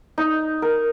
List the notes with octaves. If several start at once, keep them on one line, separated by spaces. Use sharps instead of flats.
D#4
A#4